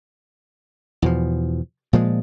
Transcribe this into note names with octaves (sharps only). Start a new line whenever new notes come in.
E2 B2 F3
A#2 F3 G#3